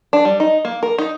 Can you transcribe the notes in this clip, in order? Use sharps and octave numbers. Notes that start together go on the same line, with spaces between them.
D4
G3
D#4
A#3
A#4
D#4